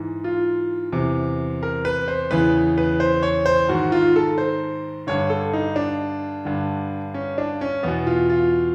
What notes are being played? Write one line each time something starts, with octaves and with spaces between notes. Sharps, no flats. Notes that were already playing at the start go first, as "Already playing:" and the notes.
Already playing: G#2 E3
F4
E2 C3 E3
A#4
B4
C5
E2 C#3 E3 B4
B4
C5
C#5
C5
G#2 D#3 F#4
F4
A4
C5
G2 D3 C#5
A4
D#4
D4
G2 D3
C#4
D4
C#4
E2 B2 B3
F4
F4